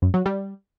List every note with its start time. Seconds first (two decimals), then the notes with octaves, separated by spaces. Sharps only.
0.02 F#2
0.14 F#3
0.26 G3